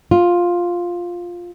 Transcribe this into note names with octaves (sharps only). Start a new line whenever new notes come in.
F4